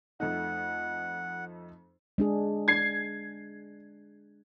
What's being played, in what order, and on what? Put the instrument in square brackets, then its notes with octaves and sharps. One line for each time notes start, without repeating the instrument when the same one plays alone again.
[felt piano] F2 A3 D#4 [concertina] F#5
[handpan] G#3 D4 G#4
[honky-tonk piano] G#6 C7